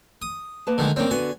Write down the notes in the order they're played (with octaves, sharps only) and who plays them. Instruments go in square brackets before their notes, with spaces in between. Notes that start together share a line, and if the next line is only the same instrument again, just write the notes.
[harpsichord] D#6
[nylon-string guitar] A#3 B4 A5
[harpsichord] D3 D#3 G#3
[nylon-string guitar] G2 C#4 G5 [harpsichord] A#3 C4
[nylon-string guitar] D3 B3 F#4 [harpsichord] G#5